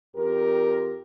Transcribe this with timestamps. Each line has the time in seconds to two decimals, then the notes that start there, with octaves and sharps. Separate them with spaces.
0.16 F2 G4 A#4